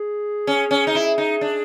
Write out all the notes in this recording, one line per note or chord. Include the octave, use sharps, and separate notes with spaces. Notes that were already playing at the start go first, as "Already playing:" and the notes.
Already playing: G#4
C#4
C#4
D#4
E4
D#4
D4